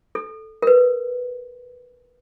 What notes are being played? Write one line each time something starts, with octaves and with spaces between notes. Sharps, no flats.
A4
A#4
B4